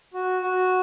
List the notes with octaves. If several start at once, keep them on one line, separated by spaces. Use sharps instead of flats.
F#4
F#4